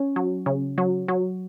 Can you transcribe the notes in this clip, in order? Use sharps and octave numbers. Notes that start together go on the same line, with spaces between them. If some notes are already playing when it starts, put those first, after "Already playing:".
Already playing: C#4
F#3
C#3
F#3
F#3